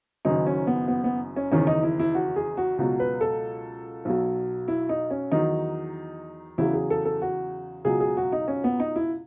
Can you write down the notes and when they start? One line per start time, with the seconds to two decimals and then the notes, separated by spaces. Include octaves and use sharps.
0.25 F#1 F#2 D#3 F#3 D#4
0.47 C#4
0.67 B3
0.88 B3
1.04 B3
1.36 C#4
1.52 F#1 E2 D#3 C#4
1.67 D#4
1.83 E4
2.00 E4
2.15 F#4
2.36 G#4
2.57 F#4
2.78 C#2 B2 F#3 F#4
3.00 B4
3.21 A4
4.05 B1 B2 F#3
4.68 E4
4.89 D#4
5.10 C#4
5.32 E2 D#3 F#3 D#4
6.58 E2 C#3 F#3 E4
6.73 G#4
6.90 A4
7.05 A4
7.22 F#4
7.85 C#2 B2 F#3 G#4
8.00 G#4
8.17 F#4
8.32 D#4
8.48 C#4
8.64 B3
8.80 D#4
8.96 E4